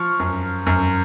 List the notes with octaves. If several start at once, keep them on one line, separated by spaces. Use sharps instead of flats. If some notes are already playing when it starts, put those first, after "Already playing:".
Already playing: F3 C#6 F6
F#2
F#2